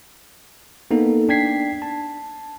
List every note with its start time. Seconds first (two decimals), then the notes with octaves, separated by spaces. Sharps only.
0.91 A#3 B3 D#4 A4
1.29 D4 G5 G#6 B6 C7
1.82 A5